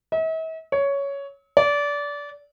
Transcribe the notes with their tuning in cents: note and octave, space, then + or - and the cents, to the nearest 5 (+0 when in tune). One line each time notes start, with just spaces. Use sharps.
E5 -45
C#5 +10
D5 -25